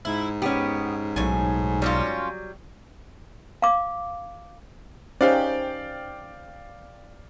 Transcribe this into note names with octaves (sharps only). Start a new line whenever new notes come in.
G#2 E4
B3 C#4 G4
B1 A2 G#5
F#3 G3 C#4 D#4 F4
F5 D6
C#4 D#4 G4 C5 D5 F5 G5